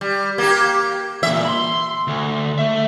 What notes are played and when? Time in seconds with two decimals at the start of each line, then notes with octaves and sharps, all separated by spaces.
0.01 G3
0.38 A#3 G4
1.23 E2 A#2 E5
1.45 B5 C6
2.07 D2
2.58 A3 E5